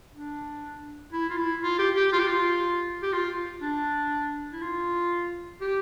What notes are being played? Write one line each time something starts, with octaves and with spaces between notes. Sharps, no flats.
D4
E4
F4
E4
F4
G4
G4
F4
G4
F4
G4
F4
D4
E4
F4
G4